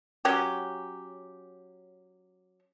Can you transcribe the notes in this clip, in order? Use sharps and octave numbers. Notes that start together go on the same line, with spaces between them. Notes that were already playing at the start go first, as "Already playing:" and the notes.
F#3 C#4 G4